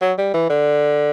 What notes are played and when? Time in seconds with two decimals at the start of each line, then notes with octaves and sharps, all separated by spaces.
0.02 F#3
0.18 G3
0.34 E3
0.50 D3